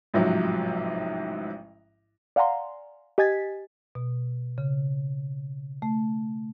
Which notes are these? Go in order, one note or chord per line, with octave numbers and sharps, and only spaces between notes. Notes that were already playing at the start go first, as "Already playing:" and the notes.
A1 G#2 C3 F3 F#3
D5 F5 F#5 G#5 A#5 C6
G4 D#5 G#5 G#6 A6 B6
B2
C#3
A3